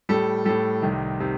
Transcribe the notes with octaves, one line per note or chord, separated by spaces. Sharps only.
A2 G3 A4
A2 G3 A4
C2 C3 D#3
C3 D#3